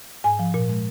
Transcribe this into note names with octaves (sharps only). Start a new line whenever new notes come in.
G#2 G#5
F3
A#2
G#3